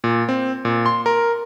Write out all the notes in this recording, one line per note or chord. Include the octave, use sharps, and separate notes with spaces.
A#2
C4
A#2
C6
A#4